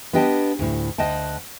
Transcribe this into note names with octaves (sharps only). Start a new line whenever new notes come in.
B3 D4 G4 D#5 G5 A5
D2 A2
D2 D#5 F#5 G5 A5